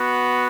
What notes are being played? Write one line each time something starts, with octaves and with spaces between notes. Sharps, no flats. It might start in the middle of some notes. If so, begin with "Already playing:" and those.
Already playing: B3 F#4